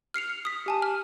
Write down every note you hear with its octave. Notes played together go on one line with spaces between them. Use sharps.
F6 C7 C#7 F7
D#6 B6
G4 G#5 A5
F6